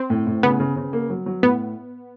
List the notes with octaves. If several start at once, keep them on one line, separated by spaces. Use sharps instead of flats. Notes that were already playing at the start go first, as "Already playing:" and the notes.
Already playing: C4
A2
A2
C#3 B3
C#3
C#3
A#3
F#3
F#3
A2 B3